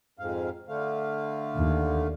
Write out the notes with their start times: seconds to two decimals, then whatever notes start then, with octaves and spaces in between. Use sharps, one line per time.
0.19 F2 G#2 F5
0.68 D3 A3 F5
1.55 D#2